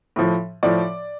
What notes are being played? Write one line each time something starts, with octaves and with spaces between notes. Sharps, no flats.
A2 F3
A2 F3 D5